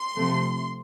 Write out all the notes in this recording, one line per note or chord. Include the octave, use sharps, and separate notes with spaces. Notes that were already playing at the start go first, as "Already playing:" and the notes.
Already playing: C6
C3 F3 A3